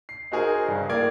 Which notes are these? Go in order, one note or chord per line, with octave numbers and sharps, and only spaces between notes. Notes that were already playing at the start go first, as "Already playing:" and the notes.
C7
D#4 F#4 G#4 A#4 C5
G2 C#3
A2 A#3 D5 G#6